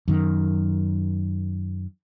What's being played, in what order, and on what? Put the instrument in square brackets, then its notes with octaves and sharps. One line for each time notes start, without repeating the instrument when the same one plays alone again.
[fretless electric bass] F#2 D#3